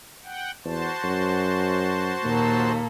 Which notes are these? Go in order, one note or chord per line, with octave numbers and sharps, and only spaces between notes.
F#5 G5
E2 F#4 C5 A5
F#2
D#2 A#2 A#3 A4